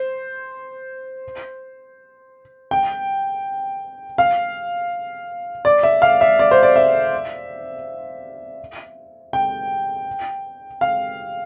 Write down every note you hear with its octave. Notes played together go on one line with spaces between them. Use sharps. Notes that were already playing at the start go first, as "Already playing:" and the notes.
Already playing: C5
G5
F5
D5
E5
F5
E5
D5
C5
D5
E5
G5
F5